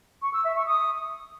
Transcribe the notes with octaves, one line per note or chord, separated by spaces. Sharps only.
C#6
E6
E5
C#6
D#6